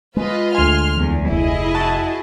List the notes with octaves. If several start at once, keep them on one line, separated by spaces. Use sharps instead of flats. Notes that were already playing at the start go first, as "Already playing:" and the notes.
G#3 F4 B4 D#5
D2 G#5 C6 F6
E2
F1 E4 G#4 D#5
F#4 A5